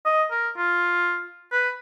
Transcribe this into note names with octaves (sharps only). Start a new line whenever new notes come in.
D#5
A#4
F4
B4